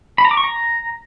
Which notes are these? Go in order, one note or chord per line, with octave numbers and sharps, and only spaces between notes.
B5
A#5
D6
C#6
A#5